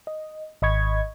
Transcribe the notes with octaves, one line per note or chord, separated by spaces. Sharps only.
D#5
G#1 D#5 B5 C#6 G#6